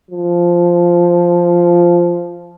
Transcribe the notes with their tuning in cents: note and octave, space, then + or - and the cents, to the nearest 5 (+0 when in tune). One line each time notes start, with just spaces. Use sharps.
F3 -5